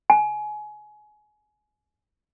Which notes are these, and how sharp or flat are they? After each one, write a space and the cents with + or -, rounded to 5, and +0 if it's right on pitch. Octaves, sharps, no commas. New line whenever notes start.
G#5 +25